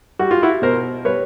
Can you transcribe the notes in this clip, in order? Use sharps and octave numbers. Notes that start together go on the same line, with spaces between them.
G3 F#4
F4
E4 F#4
B2 A#4 C5
G3 B4 C#5